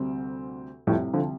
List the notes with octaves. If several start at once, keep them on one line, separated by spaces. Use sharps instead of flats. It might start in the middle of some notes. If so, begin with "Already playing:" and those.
Already playing: D2 C3 G3 C4
C2 F2 A2 C3 G3
D3 F3